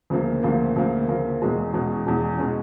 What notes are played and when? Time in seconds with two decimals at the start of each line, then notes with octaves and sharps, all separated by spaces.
0.10 D2 C#3 F3 A#3
0.43 D2 C#3 F3 A#3
0.76 D2 C#3 F3 A#3
1.08 D2 C#3 F3 A#3
1.41 E2 B2 G#3 C#4
1.73 E2 B2 G#3 C#4
2.06 E2 B2 G#3 C#4
2.38 B2 G#3 C#4